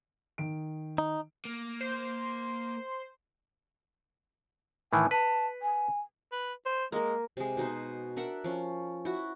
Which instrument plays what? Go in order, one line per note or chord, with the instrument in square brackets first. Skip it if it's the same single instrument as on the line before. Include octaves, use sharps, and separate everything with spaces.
[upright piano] D#3 D7
[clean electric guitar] D#4
[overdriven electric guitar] A#3
[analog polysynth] C5
[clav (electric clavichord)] A2 D#3 E3 [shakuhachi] G#5
[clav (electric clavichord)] B4 [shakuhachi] A5
[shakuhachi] G#5
[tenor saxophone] B4
C5
[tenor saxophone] G#3 [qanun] A#3 A#4
[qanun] C3 G#3
B2 D#4 C5
D4 A#4 E5 F#5
F3 C#4
E4 F#4